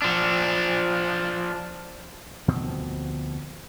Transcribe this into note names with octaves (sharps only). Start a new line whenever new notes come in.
F3 D4
D2 B2 F3 C4